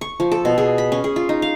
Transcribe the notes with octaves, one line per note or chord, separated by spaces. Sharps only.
C#6
F3
A4
B2
G#4
B5
C#4
G#4
F4
D#4
F5